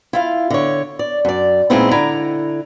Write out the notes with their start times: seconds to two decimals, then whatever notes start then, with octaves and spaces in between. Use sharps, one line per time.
0.13 E4 F4 F5
0.50 D3 C#5
0.99 D5
1.25 F#2 D5
1.70 A#2 G#3 B3 C4 D#4 E4
1.91 D3 E4 A#5